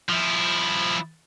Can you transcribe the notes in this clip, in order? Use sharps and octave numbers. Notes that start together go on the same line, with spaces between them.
F3 E4